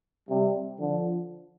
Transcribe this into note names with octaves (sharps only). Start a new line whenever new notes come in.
C3 G3
D3 F3